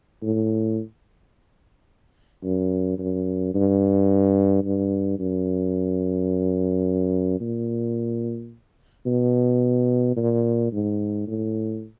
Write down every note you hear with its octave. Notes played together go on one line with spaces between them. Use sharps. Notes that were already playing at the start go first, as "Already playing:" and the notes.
A2
F#2
F#2
G2
G2
F#2
A#2
B2
A#2
G#2
A2